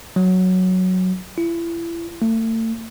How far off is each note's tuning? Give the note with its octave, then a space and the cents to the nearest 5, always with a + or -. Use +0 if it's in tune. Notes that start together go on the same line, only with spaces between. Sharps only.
F#3 +0
E4 +35
A3 +35